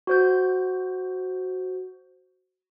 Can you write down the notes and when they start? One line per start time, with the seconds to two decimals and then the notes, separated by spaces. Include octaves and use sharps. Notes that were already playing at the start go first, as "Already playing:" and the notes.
0.07 F#4 C5 G6